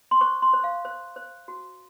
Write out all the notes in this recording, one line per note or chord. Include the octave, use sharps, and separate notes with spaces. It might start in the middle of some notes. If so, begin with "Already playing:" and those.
C6
C5 C#6
C6
C5
F5
C5
C5
F#4